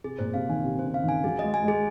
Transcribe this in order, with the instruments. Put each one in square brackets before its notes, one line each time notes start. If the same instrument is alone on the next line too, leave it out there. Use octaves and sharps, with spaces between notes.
[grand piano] C3 [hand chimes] G#4
[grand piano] A#2 [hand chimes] C5
[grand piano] C3 [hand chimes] F5
[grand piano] D#3 [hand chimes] G#5
[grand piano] C3 [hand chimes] G#4
[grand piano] C3 [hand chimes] C5
[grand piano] C#3
[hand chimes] F5
[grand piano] D#3
[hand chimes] G#5
[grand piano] F#3 [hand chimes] G#4
[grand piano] G#3 [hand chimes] D#5
[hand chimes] G#5
[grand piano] G#3 [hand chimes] G#4